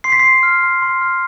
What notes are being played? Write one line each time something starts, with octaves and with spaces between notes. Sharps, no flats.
C6 C7
B6
C6 C7
F6
C6
C6
F6